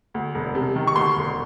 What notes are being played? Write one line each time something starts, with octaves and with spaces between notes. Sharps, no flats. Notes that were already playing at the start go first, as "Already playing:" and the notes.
D2
E1
C3
D#3
C#6
D2 C6
E1